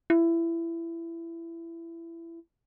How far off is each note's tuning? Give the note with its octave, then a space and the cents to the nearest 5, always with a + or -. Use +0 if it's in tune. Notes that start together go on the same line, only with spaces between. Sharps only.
E4 +20